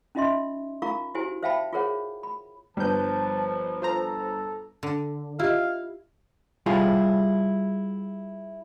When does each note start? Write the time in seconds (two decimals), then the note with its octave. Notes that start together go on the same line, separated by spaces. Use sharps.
0.15 C#4 D#4 F4 D#5 E5 C6
0.82 D#4 F4 A#4 F5 A#5 C#6
1.15 E4 F#4 G4 C5 G#5
1.43 C5 E5 F5 G5 A5 B5
1.73 F4 G#4 A#4 C5 C#5 F#5
2.23 B5
2.77 G1 F3 G3 B4 A5 G6
3.82 F4 A4 C5 A#5
4.83 D3
5.39 E4 F4 G4 D#5 F5
6.66 G3 E4 F4 G#4